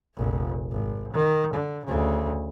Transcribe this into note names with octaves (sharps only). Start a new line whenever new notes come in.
F1 A#1
G#1
D#3
D3
D2 C#3